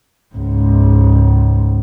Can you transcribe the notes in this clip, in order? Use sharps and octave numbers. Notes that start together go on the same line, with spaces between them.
C#2 G#2